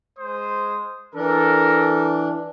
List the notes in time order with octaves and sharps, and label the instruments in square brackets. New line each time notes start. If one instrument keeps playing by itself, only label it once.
[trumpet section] G#3 C5 D#6
[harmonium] E3 D4 [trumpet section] A4 A#4